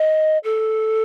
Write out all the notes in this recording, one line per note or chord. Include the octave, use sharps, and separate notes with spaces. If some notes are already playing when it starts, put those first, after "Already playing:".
Already playing: D#5
A4